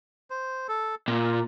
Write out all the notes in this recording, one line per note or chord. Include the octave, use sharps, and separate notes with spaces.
C5
A4
A#2 F4